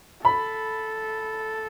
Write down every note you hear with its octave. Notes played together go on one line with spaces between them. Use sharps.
A4 B5